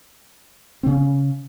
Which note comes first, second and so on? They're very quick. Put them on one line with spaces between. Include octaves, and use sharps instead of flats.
C4 C#3 C#4